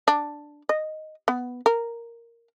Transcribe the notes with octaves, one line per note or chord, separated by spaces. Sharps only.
D4
D#5
B3
A#4